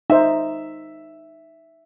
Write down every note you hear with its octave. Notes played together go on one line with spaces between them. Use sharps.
D#4 C5 E5